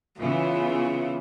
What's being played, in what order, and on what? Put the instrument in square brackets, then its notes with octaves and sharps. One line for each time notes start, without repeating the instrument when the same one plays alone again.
[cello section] C#3 E3 B3 [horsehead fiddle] F4